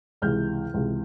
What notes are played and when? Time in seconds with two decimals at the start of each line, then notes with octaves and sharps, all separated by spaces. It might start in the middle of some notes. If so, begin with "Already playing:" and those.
0.22 C#2 C3 E3 G#3 F6 G6
0.74 C#2 C3 E3 G#3